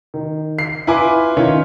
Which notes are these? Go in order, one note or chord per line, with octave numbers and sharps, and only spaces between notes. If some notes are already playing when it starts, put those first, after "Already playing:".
D#3
C7
E4 F4 B4 G#5 D6
D#3 C#4 F4 C#5